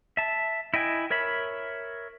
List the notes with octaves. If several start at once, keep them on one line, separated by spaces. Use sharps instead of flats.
E5 A5
E4 D#5 G5 G#5
A#4 C#5 E5 B5